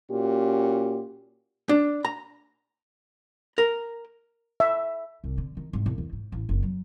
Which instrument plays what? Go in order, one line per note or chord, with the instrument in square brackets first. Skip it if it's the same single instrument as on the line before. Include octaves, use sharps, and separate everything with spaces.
[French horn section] A#2 C#4 F#4 G4
[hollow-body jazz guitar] D4
A#5
A#4
[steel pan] E5
[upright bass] C2
D3
D#3
G#2
E1
E2
G#2
A1
F#1
F#3